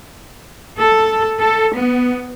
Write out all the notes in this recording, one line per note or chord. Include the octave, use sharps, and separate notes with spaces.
A4
A4
B3